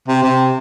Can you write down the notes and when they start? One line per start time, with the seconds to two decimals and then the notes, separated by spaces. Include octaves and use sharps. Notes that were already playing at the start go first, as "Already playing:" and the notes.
0.08 C3
0.23 C3